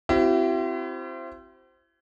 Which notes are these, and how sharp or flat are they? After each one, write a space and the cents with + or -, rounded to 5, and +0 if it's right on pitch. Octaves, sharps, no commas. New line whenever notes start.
C4 +0 E4 +35 G4 -45